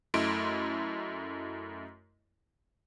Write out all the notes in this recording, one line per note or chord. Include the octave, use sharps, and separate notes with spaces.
F#2 A3 E4 D#5 C6 D7